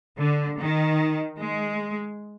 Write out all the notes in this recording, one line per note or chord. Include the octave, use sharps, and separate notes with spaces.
D3
D#3
G#3